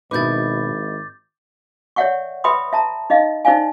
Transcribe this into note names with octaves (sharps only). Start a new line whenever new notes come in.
G#1 B2 D#4 E4 B4 D6 G6 A6
C#5 D5 E5 F#5 G5 C#6
B4 E5 G5 B5 C6 D#6
E5 A5 A#5
D#4 D#5 F5
D#4 C5 D5 F5 G#5